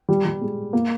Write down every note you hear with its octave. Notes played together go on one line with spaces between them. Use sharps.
G3
G3
G#3
A#3